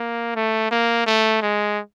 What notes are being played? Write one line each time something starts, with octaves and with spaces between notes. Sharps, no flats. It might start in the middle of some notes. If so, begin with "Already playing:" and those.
Already playing: A#3
A3
A#3
A3
G#3